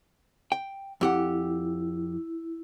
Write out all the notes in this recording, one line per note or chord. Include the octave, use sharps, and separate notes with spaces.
G5
F2 E4 G4 F#5